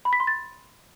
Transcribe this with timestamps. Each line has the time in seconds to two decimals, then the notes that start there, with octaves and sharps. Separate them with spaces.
0.05 B5
0.13 B6
0.20 C6
0.27 A6